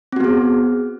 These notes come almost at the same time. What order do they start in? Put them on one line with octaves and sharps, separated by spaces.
C4 F#4 B3 G#4